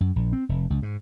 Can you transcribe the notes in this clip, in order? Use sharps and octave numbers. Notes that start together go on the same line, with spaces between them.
F#2
A#1
C4
F1
C#2
G#2